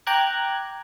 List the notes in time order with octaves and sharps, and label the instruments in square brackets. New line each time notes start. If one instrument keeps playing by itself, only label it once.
[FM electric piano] G5 A#5 D6 F#6 G#6